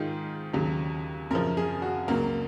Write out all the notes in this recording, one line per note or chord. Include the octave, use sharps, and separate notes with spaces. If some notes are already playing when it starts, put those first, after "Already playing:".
Already playing: G#2 D#3 G#3 F4
D#2 C#3 F#3
F#2 C#3 F3 A#4
G#4
F#4
C#2 C#3 F#3 A#3